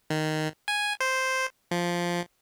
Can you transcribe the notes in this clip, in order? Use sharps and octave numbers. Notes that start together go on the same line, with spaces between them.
D#3
G#5
C5
F3